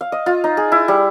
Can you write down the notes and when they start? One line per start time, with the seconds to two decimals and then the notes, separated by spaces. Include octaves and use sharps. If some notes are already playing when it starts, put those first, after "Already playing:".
0.01 F5
0.12 D#5
0.26 F4
0.44 D#4
0.57 G#4
0.72 E4
0.88 G3